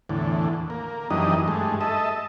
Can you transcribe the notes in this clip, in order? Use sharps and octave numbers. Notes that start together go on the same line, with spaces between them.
E2 A2 D3
A#3
F#2 E3 G3 D4 D#4 D#5
G2 G#3 A3
A4 D#5 E5